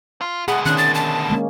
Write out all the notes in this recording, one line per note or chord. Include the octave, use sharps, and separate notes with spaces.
F4
D2 B2 G#4 F#5
D#3 C#4 D4 F#6
A6
A5
G#3 A#3 C#4